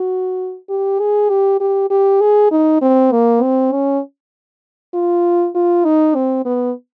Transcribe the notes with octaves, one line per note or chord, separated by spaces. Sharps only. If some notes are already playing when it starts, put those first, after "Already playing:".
Already playing: F#4
G4
G#4
G4
G4
G4
G#4
D#4
C4
A#3
C4
C#4
F4
F4
D#4
C4
B3